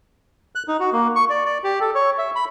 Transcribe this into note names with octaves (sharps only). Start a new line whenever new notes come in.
F#6
D#4
F#4
A#3
C#6
D5
D5
G4
A4
C#5
E5
B5